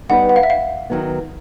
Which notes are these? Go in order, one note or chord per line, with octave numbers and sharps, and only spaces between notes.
G3 B3 D#4 G4 B4 F#5
F#5
F5
E5
F5
D#3 F#3 B3